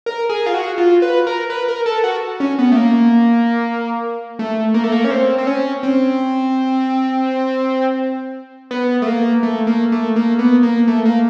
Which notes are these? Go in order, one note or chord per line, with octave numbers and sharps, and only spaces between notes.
A#4
G#4
F4
F#4
F4
B4
A#4
B4
A#4
A4
F#4
C#4
B3
A3
A#3
A3
A#3
A3
A#3
C#4
C4
C4
C#4
C4
B3
A3
A#3
A3
A#3
A3
A#3
B3
A#3
A3
A#3